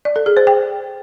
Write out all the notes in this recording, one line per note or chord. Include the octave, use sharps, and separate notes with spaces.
D5
A4
G#4
C5
G5